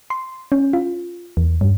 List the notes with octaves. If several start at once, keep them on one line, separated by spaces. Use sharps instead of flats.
C6
C#4
F4
E2
G2